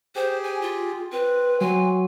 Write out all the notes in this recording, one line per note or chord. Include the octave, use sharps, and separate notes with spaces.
G4 G#4 C5
G#5
F4
C4 B4
F#3 G#5 C6